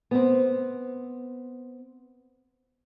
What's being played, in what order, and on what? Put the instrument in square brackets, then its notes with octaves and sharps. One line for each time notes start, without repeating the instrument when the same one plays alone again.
[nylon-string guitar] B3 C4